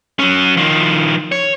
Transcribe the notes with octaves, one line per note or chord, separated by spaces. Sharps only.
F#3 C#4
D#3 F3
C#5